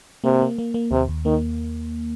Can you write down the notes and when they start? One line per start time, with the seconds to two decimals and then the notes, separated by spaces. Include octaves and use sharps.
0.24 C3 A#3
0.42 A#3
0.58 A#3
0.74 A#3
0.91 D#2 C3
1.08 D#2
1.25 D#3 A#3